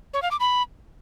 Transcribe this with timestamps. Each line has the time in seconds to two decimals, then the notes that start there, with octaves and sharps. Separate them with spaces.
0.14 C#5
0.22 F5
0.31 D6
0.40 B5